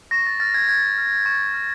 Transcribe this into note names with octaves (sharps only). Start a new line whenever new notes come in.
C#6 A#6
A6
F6 A6
G#6
C#6 G#6
F6
C#6
F6